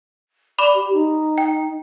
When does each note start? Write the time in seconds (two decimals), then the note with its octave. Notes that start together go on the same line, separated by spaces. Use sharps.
0.59 D5 B5 D6 E7
0.74 G4
0.93 D#4
1.38 G5